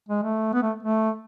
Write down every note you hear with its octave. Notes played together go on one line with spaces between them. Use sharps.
G#3
A3
B3
A3
A3